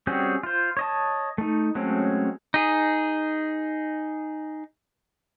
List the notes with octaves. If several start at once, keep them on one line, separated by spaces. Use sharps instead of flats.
G3 C4 C#4 F#4 G#4
F4 C5
C#5 D#5 A5
A3 D#4
F#3 G#3 A3 C4 C#4
D#4 G#4